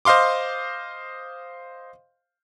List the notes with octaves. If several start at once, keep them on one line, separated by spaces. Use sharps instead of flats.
C5 D#5 F5 C6 D6